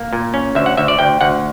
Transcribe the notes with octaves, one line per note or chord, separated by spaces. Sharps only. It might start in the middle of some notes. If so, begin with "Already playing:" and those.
Already playing: A#3
A#2
C#4
D2 E5
F#5
D2 E5
D5
D2 G5
D2 F#5